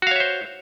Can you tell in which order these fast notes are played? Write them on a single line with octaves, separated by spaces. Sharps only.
F#4 F5 C#5 E5 C5